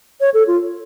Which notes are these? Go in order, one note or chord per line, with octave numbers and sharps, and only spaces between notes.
C#5
A4
F4